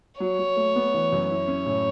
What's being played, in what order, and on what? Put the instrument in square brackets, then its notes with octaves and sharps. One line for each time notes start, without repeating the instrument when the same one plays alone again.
[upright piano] F#3 [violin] C#5
[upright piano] F#3
A3
B3
E3
F#2
[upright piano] E4 [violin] C#5
[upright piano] C#4
A2